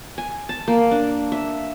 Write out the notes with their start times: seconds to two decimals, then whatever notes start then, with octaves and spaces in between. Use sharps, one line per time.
0.18 G#5
0.49 A5
0.68 A#3
0.91 D4
1.32 E5